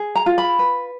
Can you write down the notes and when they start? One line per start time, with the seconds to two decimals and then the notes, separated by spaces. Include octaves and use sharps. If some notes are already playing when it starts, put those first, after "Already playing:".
Already playing: G#4
0.16 A#5
0.26 F4
0.38 B5
0.59 B4